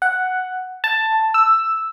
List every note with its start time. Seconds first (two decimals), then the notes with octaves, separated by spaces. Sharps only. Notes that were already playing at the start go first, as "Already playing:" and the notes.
0.02 F#5
0.84 A5
1.34 E6